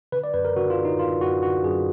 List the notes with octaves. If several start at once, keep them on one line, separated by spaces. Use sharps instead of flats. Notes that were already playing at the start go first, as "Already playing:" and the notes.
D3 B4
D5
F#2 B4
A#4
D3 F#4
F4
D3
D#4
D3 F4
F#2 F#4
D3 F#4
F#2 G#4